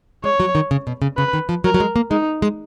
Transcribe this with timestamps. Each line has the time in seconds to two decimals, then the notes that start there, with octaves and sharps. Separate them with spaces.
0.24 G#3 C#5
0.40 F#3
0.55 D#3
0.71 C#3
0.87 B2
1.02 C#3
1.17 C#3 B4
1.33 D#3
1.49 F3
1.64 F#3 A#4
1.74 F#3
1.80 G#3
1.96 A#3
2.11 G#3 D#4
2.42 G#3